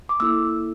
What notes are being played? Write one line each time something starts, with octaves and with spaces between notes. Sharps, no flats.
D6
A#3 E4 A4 E6